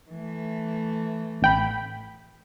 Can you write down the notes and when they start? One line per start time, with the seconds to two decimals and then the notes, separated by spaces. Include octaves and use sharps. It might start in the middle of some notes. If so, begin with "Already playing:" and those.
0.10 E3 A3
1.42 A1 G5 B5